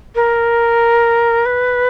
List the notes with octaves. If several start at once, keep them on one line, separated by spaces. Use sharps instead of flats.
A#4
B4